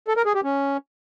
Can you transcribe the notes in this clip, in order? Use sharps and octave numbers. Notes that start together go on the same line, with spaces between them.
A4
A#4
G#4
G4
C#4